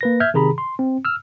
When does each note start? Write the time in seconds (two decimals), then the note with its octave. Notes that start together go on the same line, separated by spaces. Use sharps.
0.01 A#3 B4 A#6
0.20 E5 F6 G6 G#6
0.34 C3 D#3 G#4 A#5 B5
0.58 C6
0.79 C4
1.05 E6 F6